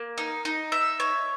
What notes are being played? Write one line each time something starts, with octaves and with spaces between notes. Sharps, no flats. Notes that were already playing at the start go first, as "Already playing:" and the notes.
Already playing: A#3
D#4
D#4
E5
C#5